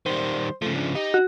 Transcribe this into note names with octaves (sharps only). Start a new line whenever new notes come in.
D#3 G3 C5
C#3 F3 A3
D4
D#4 G4
F#4